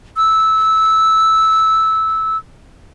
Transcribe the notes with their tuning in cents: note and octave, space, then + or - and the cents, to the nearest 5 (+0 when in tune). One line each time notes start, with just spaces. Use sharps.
E6 -15